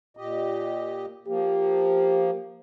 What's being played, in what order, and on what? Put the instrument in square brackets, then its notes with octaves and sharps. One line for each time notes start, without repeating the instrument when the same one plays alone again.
[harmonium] A#2 G4 D#5
[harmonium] F3 A#3 [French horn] G4